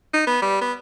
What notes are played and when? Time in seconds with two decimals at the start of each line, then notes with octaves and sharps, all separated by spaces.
0.14 D#4
0.27 B3
0.42 G3
0.61 B3